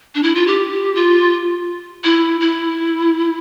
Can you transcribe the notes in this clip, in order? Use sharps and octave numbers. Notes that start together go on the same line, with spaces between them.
D4
E4
F4
G4
F4
E4
E4